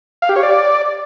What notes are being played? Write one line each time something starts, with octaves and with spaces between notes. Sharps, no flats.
F5
G4
C#5
D5